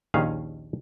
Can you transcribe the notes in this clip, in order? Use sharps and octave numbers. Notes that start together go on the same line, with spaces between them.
A#1 D#2 D#3 C#4 G#4 F5